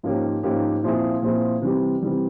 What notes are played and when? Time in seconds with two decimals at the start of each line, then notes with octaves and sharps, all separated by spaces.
0.03 G#2 F3 A#3 C#4 G4
0.43 G#2 F3 A#3 C#4 G4
0.83 A#2 F3 C4 E4 G#4
1.22 A#2 F3 C4 E4 G#4
1.62 C3 E3 G3
2.02 C3 E3 G3